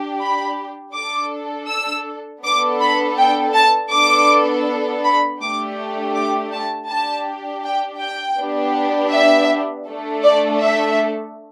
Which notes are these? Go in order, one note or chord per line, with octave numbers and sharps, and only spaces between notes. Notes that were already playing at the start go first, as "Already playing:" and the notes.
Already playing: D4 G4
B5
D4 A4 D6
E6
B3 D4 A4 D6
B5
G5
A5
B3 D4 A4 D6
B5
A3 D4 G4 D6
D6
A5
D4 G4 A5
G5
G5
B3 D4 G4
E5
A3 D4 A4
D5
E5